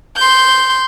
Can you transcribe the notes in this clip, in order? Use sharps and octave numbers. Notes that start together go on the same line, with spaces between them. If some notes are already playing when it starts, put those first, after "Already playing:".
C6 G6